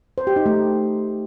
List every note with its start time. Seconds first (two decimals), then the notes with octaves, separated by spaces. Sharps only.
0.18 C5
0.27 G4
0.36 D#4
0.46 A3